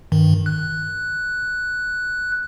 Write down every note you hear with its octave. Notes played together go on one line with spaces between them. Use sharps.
G2 D#3
F#6